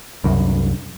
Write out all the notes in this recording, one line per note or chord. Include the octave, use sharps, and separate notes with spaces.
C2 F#2